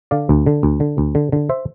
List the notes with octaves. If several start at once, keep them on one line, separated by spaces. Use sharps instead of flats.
D3 D5 F5
D2
D3
D2
D3
D2
D3
D3
C5 E5